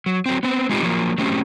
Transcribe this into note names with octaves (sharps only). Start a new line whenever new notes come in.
F#3
F#3 C4
B3 C4
G#3 C4 D#4 F4 G4
F3 F#3 A#3
F#3 A3 C4 C#4 G4